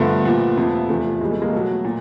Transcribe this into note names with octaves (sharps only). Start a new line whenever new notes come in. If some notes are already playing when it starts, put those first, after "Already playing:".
Already playing: G2 D3 F3 A3 B3
A#2 F3
F2 C3 F3
E2 C3 F3 A3
A2 E3 G3 G#3
A3
G#3 A#3
B2 F#3 A3
A#2